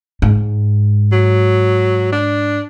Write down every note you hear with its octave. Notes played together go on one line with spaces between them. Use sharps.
G#2
F#3
D4